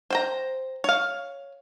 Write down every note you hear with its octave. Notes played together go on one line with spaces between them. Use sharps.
C5 G5 A#5
C#5 F5